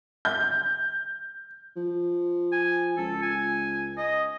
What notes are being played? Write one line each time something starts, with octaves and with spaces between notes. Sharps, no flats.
G6
F3
G#5
C#2 A4
G#5
D#5